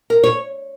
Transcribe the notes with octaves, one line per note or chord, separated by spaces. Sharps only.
A#4
C#5